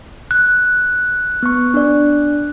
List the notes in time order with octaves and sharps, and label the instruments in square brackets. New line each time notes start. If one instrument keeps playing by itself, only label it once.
[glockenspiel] F#6
[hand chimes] B3 C#6
D4 D5